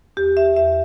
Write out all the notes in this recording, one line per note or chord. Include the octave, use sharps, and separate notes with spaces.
E2 G4
E5
E2 E5